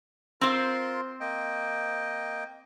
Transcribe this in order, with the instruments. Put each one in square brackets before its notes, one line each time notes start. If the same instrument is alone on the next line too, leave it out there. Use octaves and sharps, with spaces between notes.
[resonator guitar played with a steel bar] C4 C5 [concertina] F4 A#4 C6
[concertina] A#3 D#5 G5